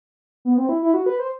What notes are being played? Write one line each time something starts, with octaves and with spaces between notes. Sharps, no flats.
B3
C4
E4
E4
F#4
B4
C5